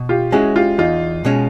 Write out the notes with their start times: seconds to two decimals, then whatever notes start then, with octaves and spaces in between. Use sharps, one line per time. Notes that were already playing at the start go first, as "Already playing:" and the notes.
Already playing: B2
0.09 F4 G4
0.32 G#3 C#4 E4 F#4 G#4
0.56 F4 G4
0.78 E2 D#4 F4
1.25 B2 G#3 C#4